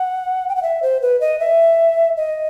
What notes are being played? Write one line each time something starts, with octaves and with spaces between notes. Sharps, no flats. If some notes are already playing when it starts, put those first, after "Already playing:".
Already playing: F#5
G5
F#5
E5
C5
B4
D#5
E5
D#5